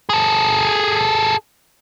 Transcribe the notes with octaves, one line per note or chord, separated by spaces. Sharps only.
G#4 A4